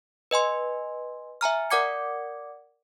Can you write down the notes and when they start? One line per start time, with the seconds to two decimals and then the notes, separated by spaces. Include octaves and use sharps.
0.31 B4 D#5 G#5 C6
1.41 E5 G#5 A#5 F6
1.70 A#4 D5 F#5 D6 G#6 C#7